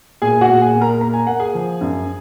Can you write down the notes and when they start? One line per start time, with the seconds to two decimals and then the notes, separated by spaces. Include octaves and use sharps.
0.22 A#2 G#4 G#5
0.36 G#5
0.41 F#4 F#5
0.48 A#2
0.61 G#4 G#5
0.74 A#2
0.81 A#4 A#5
1.01 A#3 A#5
1.14 G#5
1.27 A#3 F#5
1.40 G#4 G#5
1.55 F3
1.81 F#2